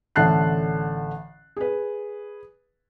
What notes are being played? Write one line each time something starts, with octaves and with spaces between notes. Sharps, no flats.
A1 D3 E5 A5 F#6 C7
G#4 B4